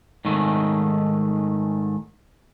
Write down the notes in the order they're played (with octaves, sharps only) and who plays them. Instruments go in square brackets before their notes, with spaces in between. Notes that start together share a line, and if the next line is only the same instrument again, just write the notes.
[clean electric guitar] G#2 D#3 A3